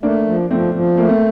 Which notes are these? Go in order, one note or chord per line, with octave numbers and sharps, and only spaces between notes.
A3 A#3 D4
F3
F3 A3 C4
F3
A3 A#3
C4